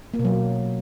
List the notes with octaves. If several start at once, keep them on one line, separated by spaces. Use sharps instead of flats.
A#3
B2
F#3